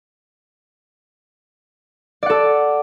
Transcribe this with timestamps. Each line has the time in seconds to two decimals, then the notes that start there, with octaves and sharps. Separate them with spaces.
2.23 D5
2.26 F#5
2.30 A4